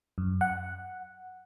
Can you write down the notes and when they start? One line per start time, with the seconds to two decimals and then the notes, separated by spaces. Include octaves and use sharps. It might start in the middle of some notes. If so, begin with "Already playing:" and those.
0.18 F#2
0.41 F#5